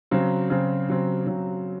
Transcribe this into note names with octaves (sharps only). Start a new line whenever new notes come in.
C#3 F#3 C4
C#3 F#3 C4
C#3 F#3 C4
C#3 F#3 C4